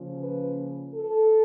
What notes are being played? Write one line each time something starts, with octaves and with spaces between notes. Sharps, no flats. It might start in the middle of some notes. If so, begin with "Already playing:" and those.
Already playing: C#3 F3 A#3 C#4
B4
A4